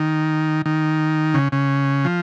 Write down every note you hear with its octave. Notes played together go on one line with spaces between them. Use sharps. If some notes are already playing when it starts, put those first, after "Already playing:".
Already playing: D#3
D#3
C#3
C#3
F3